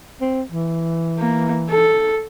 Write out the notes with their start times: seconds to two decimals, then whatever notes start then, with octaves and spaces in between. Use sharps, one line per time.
0.21 C4
0.52 E3
1.20 A#3
1.70 A4